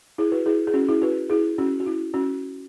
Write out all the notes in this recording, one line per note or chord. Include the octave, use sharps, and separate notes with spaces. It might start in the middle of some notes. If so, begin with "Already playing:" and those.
E4 G#4
F#4 B4
E4 G#4
G#4
C#4 F#4
E4 G#4
F#4 B4
E4 G#4
C#4 F#4
F#4
E4
C#4 F#4